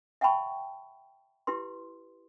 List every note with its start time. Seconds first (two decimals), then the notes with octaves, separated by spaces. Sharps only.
0.21 E5 F#5 G5 A5 B5 C#6
1.47 E4 G4 B4 C6